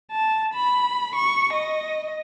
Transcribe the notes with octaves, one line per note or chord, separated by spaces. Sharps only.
A5
B5
C#6
D#5